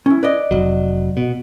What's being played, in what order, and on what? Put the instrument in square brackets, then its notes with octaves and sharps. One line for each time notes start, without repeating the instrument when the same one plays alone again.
[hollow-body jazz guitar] C#4 E4
B4 D5 D#5
[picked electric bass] F1 F#3
B2